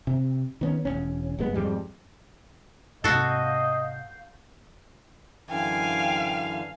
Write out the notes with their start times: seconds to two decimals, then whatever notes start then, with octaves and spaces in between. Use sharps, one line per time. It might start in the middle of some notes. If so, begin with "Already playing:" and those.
0.07 C3
0.61 D#3 B3 C#4
0.85 E1 A2 C#4
1.39 F#1 G2 G#3 B3
1.54 F2 G#2 G3 G#3
3.04 G#2 C3 F#4 A4 D#5 F5 G6
5.49 F#2 D3 E3 F5 G5 G#5